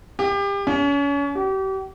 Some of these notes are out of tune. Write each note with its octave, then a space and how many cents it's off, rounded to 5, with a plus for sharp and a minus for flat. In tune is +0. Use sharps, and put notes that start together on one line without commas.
G4 +30
C#4 +35
G4 -35